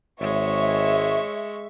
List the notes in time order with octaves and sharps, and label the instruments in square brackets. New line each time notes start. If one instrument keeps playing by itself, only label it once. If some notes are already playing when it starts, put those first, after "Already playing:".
[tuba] G#1 [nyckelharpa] G#3 [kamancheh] C#5 [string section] E5 C#6